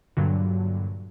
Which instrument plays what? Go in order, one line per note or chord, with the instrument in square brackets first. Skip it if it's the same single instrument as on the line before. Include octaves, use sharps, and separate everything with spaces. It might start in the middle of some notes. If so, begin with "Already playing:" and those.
[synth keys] G2 A#2 D3 F#3